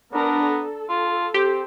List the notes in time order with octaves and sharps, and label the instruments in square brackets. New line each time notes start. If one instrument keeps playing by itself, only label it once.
[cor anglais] B3 [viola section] D4 A#4 A#5
[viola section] A4
[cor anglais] F4
[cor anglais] C4 [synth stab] G4